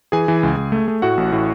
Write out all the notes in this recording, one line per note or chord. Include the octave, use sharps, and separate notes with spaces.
E3 G#4 G#5
E3
C#2
C#2
A3
A3
A2 F#4 F#5
A1
A2